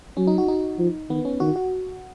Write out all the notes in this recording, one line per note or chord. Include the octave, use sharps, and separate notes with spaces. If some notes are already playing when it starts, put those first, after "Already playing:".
F#3 C#4
D#4
F#4
D#4
F3
D#3 B3
C#4
D#3 F#4
F#4